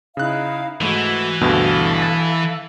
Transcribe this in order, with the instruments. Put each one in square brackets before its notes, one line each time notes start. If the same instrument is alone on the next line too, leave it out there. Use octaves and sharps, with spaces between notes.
[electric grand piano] C#3 F#6 [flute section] D#4 E4 F5
[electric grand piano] G#2 A3 [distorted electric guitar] E3 [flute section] F#4
[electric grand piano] D2 G2 B2 [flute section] A4 F5
[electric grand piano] A6